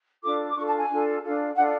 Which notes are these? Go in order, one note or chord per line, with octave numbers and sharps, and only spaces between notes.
D4 F4 A4 D6
D6
D4 F4 A4 C#6
A5
G#5
D4 F4 A4
D4 F4 A4
D4 F4 A4 F#5